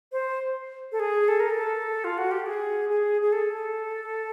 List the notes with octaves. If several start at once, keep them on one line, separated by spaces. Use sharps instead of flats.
C5
A4
G#4
A4
A#4
A4
F4
F#4
G4
G#4
G#4
G#4
A4